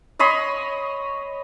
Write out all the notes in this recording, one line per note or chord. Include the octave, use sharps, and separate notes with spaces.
C#5 D#5 B5 C6